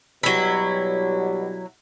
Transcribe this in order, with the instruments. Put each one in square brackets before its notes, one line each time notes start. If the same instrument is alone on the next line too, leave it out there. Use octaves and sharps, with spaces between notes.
[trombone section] B2 G3 [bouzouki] F#3 E4